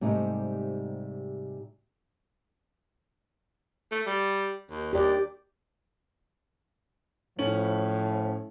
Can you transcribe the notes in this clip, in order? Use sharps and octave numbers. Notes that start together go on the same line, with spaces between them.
G#2 C3 G3 A3 D#4
A3
G3
D#2
D#2 G4 D5
A2 F3 C#4 F#7